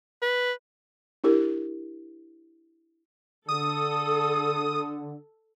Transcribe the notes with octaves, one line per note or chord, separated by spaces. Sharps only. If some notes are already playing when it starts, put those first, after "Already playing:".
B4
D4 E4 G4 A#4
D3 A4 D#6